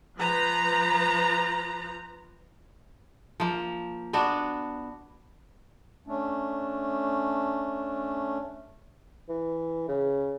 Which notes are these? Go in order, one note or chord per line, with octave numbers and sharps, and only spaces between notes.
F3 B4 A#5
F3 A#3
B3 D4 F#4
A3 C#4 D4
E3
C#3